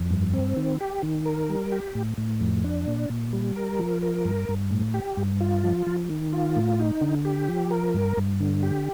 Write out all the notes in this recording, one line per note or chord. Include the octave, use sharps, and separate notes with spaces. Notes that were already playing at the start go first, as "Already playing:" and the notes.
Already playing: F2
G2
C4
D#3
G4
D#3
A#4
G3
G4
A2
A2
F2
D4
A#2
A#2
G3
A#4
F3
A#4
G2
G2
A2
G4
G2
F4
F3
F3
D#3
F4
A2
D#4
D3
G4
F3
A#4
G2
G2
D3
G4